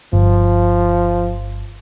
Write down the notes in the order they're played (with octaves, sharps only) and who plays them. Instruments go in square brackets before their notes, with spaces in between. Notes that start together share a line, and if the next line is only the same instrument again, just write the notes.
[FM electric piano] G1 [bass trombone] F3